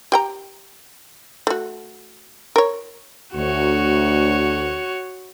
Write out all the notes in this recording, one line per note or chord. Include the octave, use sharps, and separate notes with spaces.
G4 G5 A#5
A3 F#4
A#4 C#5
D2 F#4 C#5